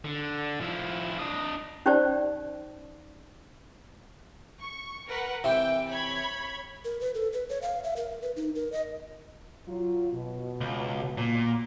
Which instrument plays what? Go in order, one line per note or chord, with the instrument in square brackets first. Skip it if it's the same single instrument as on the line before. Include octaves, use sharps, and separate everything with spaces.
[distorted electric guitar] D3
F3 E4
D4 D#5
[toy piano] C#4 D#4 G4 C5 D5 A5
[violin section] C#6
A#4 B4 F#5
[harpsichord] C3 E3 [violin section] G5
[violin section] C#5 B5 G#6
[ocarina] A#4
B4
A4
B4
C#5
F5
E5
A#4
B4
D#4
A#4
D#5
[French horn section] F#3 F4
B2
[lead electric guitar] C#2
A#2